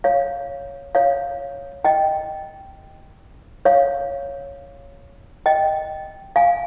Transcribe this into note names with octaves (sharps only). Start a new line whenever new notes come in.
C#5 F5
C#5 F5
D#5 G5
C#5 F5
D#5 G5
F5 G#5